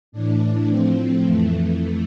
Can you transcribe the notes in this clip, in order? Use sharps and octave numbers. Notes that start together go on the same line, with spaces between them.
A2 E3 D4
A2 F3 C4
F2 E3 A3
A3